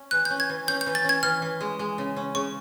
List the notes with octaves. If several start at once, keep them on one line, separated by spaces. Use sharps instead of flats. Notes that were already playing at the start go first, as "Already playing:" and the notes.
Already playing: C#4
E3 F#6
C#4 G6
G#6
E3
C#4 G6
G6
E3
A6
C#4 G#6
E3 F6
E3
G#3
G#3
C#3
C#4
C#3 C#6